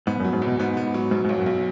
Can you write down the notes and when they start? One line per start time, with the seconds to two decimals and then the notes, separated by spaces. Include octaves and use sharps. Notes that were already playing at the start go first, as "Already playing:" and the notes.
0.07 G#2 B3
0.20 F#2
0.24 F#3
0.33 G#2
0.42 E2 B2
0.59 G#2 B3
0.77 B3
0.94 F#3
1.11 G#2 B2
1.25 G#2
1.29 B1
1.38 F#2
1.46 B1